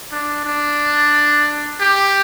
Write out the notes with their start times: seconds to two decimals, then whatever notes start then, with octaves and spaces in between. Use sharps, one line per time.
0.11 D4
0.45 D4
1.81 G4